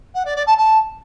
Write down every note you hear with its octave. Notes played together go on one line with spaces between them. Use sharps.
F#5
D5
D5
A5
A5